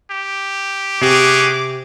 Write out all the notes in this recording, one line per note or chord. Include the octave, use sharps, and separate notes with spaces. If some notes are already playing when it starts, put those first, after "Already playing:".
G4
C3 F#4 G#4 D6